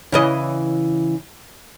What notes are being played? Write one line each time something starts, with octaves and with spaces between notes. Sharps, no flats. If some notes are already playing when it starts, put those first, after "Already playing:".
C#3 E3 D#5